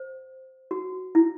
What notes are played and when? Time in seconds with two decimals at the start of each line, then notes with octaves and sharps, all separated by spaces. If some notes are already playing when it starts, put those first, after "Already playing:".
Already playing: C5
0.71 F#4
1.15 E4